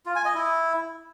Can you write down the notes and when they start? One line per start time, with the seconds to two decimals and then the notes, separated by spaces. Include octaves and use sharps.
0.06 F4
0.15 G#5
0.25 D#5
0.35 E4